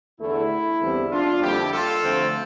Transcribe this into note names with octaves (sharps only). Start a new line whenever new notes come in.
E2 D3 A3 E4
E2 D3 G3 C4
D4 F4
F2 D3 G3 A#3 E4 G4
F4 A4
D2 D3 F3 A3 C4